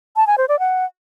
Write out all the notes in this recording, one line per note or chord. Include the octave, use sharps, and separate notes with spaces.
A5
G#5
C5
D5
F#5